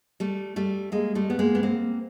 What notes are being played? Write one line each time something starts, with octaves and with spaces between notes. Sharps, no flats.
G3 A3
G3 A3
G#3 A#3
G3 A3
B3
G#3 A#3
B3
A#3 C4